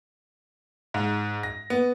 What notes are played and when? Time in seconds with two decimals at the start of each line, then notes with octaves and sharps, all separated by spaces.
0.94 G#2
1.43 A#6
1.70 B3